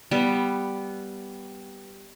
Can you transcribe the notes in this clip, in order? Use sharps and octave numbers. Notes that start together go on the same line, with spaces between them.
G3 B3